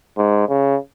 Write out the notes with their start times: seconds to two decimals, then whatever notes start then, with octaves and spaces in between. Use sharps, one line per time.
0.17 G#2
0.48 C#3